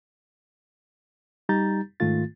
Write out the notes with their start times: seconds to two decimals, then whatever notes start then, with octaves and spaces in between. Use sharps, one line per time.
1.49 G3 D#4 G4 A#5 G6 A6
2.00 G#2 D#3 A3 F4 A6